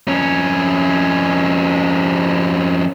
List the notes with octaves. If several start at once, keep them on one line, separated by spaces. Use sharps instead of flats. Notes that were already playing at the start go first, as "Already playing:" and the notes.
F2 C#4